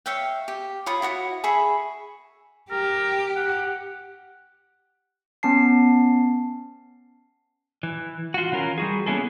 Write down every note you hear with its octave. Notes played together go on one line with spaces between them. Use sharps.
C#5 E5 F5 G5
G4
F4 C#5 B5 D#6
E4 F#4 C#5 D#6
G#4 E5 B5 C#6
G4 A#4
F#5
B3 C#4 A5 C7
E3
F4 F#4
E3 C#4 F4 A#4
G3 F#4 G#4
A#3 B3 C#4 E4 G#4 A4